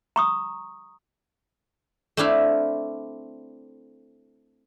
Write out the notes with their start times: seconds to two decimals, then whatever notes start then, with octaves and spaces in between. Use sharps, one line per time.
0.16 A#5 C#6 D#6
2.17 A3 C4 D4 E4 F5